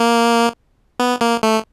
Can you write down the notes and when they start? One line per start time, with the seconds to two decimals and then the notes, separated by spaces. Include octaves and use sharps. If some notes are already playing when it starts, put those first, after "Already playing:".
Already playing: A#3
1.00 B3
1.21 A#3
1.43 A3